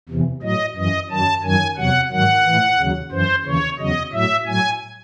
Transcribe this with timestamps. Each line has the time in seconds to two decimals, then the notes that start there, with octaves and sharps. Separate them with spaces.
0.09 E2 C3 E3
0.43 A2 F#3 D#5
0.76 F#2 E3 D#5
1.10 F#2 D#3 F#3 A5
1.43 F#2 D#3 F#3 G#5
1.77 E2 C3 F#3 F#5
2.11 G#2 D#3 F#3 F#5
2.45 A2 E3
2.79 D#2 C#3 F#3
3.11 F#2 E3 C5
3.45 D#2 C#3 E3 C#5
3.79 E2 C#3 F#3 D#5
4.13 A2 F#3 E5
4.47 A2 F#3 G#5